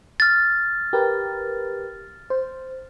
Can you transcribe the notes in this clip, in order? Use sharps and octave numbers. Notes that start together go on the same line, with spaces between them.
F6 A6
G4 A#4 B4
C5